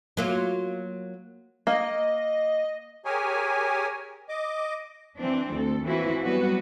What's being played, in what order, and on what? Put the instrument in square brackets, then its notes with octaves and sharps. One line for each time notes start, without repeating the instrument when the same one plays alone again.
[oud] F#3 A#3 F4
[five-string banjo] A#3 [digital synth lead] D#5
[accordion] G4 G#4 A#4 C#5 G#5
D#5 D6
[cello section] E3 C4 D4
D2 A4
E3 A#3 C4 E4 F#4 B4
F#3 G3 B3 F#4 B4